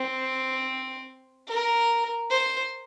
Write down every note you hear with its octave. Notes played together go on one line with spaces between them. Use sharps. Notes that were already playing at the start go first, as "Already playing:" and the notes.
Already playing: C4
A#4
C5